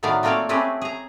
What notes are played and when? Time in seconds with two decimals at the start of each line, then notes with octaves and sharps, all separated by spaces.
0.03 A2 D#3 F#3 B3 D5 F5
0.23 A3 A#3 C4 F4 C#5 D5
0.49 A3 C4 C#4 G4 G#4 B4
0.81 G#4 A#5